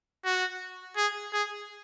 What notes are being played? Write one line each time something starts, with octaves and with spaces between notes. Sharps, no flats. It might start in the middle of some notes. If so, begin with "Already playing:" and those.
F#4
G#4
G#4